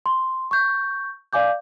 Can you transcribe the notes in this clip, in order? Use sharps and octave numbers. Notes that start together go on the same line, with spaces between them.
C6
C#6 G6
D5 F5 G#5 D6 G6